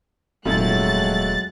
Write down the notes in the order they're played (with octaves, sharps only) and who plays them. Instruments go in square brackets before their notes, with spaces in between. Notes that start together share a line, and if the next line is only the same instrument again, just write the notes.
[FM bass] D#1 [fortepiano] F2 G#2 [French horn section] F#3 G#3 A3 [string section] F#6 A6